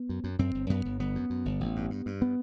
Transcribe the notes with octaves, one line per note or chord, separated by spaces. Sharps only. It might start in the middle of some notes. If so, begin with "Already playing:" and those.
Already playing: B3
F#2
F#2
F#2 C4
G1
F#2 B3
G1
G1 B3
F#2
F#2
G1
A1
G2
G2
G2
B3